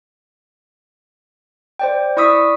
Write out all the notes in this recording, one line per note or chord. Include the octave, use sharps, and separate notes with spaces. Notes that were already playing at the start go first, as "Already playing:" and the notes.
C5 D5 G5
E4 D5 C#6 D#6 E6 B6